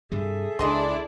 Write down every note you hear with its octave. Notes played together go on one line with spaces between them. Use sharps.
G2 C3 G3 G#4 A4 E5
C#2 E3 D4 E4 D5 D#5 C6